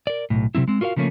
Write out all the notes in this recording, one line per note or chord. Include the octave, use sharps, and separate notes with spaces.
A#4 D5
B1 A2
C3 F#3 C4 E4
G#3 C4
F4 F#4 A#4 D5 F5
C#3 F3 A3 A#3 C#4